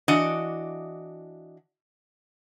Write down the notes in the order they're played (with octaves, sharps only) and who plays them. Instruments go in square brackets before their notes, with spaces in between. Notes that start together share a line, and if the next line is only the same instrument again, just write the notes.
[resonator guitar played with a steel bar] E3 D4 F#4 D#5